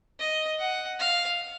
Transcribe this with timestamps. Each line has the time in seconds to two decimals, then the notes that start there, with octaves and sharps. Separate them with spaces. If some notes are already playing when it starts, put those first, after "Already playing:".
0.19 D#5
0.59 F#5
0.99 F5